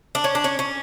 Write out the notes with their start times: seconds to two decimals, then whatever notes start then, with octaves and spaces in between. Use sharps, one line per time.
0.15 D4
0.24 C#4
0.35 D4
0.44 C#4
0.59 C#4